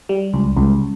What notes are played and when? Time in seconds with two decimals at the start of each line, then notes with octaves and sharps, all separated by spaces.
0.09 G3
0.34 C#2
0.57 C#2